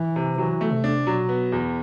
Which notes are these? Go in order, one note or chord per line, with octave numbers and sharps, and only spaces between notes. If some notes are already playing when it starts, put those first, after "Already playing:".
Already playing: E3
C3
E3 F#3
A3
C3
D4
B2 F#3
B3
E2